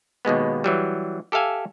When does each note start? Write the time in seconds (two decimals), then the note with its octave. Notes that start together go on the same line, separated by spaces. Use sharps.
0.25 D#2 B2 G#3 B3
0.64 E3 F#3 G3
1.32 G4 A4 E5 F5 G#5